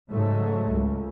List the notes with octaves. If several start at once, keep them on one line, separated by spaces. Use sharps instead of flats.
G#2 C#3 F#3 G#3 A3
C#2